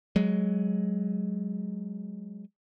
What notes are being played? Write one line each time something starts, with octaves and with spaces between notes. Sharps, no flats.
F#3 G#3